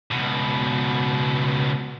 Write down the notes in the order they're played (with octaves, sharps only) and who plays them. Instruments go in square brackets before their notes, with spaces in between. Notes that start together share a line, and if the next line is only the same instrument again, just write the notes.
[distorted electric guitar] C#2 B2